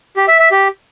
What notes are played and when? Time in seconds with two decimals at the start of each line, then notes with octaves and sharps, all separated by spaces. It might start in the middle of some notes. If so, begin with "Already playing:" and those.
0.17 G4
0.28 E5
0.40 E5
0.51 G4